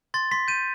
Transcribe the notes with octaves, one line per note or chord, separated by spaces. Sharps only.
C6 A6
C6 B6
G6 D#7